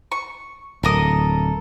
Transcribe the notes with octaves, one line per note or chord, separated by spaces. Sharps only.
C#6
D1 A4 A#4 D#6